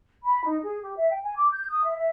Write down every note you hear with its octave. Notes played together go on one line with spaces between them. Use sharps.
B5
D#4
G#4
G4
E5
G5
G#5
D6
G6
D#6
E5
E5